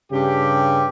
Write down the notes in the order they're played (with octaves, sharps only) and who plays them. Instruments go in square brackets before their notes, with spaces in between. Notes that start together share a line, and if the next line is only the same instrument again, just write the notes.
[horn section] G2 C#3 G4